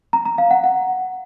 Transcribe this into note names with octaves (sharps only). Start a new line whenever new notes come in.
A#5
A#5
F5
F#5
F#5